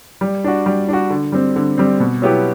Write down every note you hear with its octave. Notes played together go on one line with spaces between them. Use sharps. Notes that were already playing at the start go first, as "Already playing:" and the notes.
G3
D4 F#4
G3
D4 F#4
D3
G3 C4
D3
G3 C4
B2
F#3 B3 E4 G4